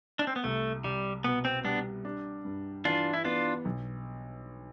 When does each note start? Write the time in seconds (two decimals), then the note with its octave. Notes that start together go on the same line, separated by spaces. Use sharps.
0.19 D4
0.27 C4
0.36 B3
0.44 C2 A3
0.84 C2 G3
1.24 B2 B3
1.45 C4
1.64 G3 B3 D4
2.05 D4
2.45 G2
2.85 E3 D4 F4
3.14 E4
3.25 B3 D4 F4
3.65 B1